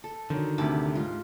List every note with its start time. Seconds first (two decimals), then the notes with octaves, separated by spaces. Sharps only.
0.04 A4
0.30 D3 D#3 F#3
0.58 D2 C3 G4 A5 B5
0.95 G#2 F4